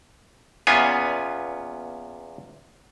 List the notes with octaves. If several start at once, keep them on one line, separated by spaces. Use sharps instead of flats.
E2 A#2 B3 C#4 F4 G#5